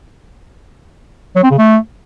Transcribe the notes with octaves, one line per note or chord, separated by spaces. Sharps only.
F#3
C4
C#3
A3